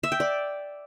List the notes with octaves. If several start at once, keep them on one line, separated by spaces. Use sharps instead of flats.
E5
G5
D5